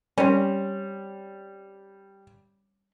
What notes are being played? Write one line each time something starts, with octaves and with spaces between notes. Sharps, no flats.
G3 C4 C#4